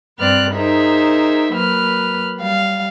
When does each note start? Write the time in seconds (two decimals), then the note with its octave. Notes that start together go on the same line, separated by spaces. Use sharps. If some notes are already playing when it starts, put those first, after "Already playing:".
0.18 G2 C4 B4 D5 F6 F#6
0.53 D#4 G#4 A#4 C5 E5
1.53 F#3 A#3 B4 F6
2.37 G3 F5